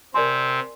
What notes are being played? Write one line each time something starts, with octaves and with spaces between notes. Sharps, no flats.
C3 C4 A#4 D5 G#5 C6